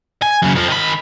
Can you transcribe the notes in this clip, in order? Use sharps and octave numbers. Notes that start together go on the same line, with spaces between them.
G#5
F#2 C#3
F2 F3
D#3 B5